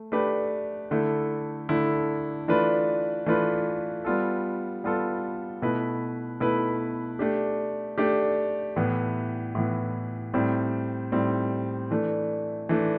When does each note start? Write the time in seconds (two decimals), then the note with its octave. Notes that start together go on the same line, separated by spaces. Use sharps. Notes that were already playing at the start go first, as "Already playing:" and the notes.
Already playing: A3
0.12 A3 D4 G4 B4
0.91 D3 A3 E4
1.69 D3 A3 E4
2.48 E3 A3 D4 F4 B4
3.26 E3 A3 D4 F4 B4
4.05 G3 B3 F4 A4
4.84 G3 B3 F4 A4
5.62 B2 A3 E4 B4
6.40 B2 A3 E4 B4
7.19 A3 D4 G4
7.98 A3 D4 G4
8.76 A2 E3 B3
9.55 A2 E3 B3
10.34 A2 G3 C4
11.12 A2 G3 C4
11.91 E3 A3 D4
12.69 E3 A3 D4